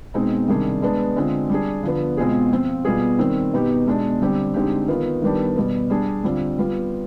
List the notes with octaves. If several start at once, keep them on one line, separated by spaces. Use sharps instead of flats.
B2 G#3 C4 D#4
C3 D#3 G3 D4 G#4
G#3 B3 D4
D3 G#3 C4 F4
G3 D4 G#4
D3 F3 B3
B2 G#3 C4 F4 G#4
F3 C4 F4
B2 G3 B3 F4 G#4
D#3 G3 C4
B2 B3 D#4 G4
B2 G#3 D4
D3 G3 C4 G4
D3 G#3 C4 D#4 G4
D#3 B3 F4
D#3 G3 B3 D4 G4
B2 G3 B3
G3 D4 G#4
D3 G3 C4 F4
G3 B3 F4